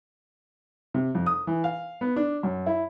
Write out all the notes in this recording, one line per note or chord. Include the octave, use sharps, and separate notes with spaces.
C3
F2
D#6
E3
F5
B3
D4
F#2
E4